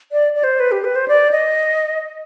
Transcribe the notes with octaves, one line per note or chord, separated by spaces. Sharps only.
D5
D5
C5
B4
G4
B4
C5
D5
D#5